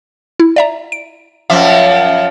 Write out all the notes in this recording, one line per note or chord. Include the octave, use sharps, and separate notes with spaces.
E4
D5 E5 A#5
D7
F#2 F3 E5 D6